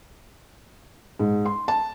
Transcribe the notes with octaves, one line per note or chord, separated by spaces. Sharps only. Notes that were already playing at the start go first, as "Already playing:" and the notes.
G#2
C6
A5